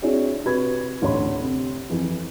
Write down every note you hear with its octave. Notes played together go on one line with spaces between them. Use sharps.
C4 D4 E4 F#4 G#4 C#5
C3 F#4 B4 B5 G#6
A1 D2 A2 C#5 B5 C6
C3
F2 E3